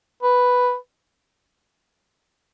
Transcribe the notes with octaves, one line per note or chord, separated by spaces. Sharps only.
B4